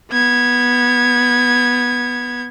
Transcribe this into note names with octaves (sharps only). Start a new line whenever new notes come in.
B3 G#6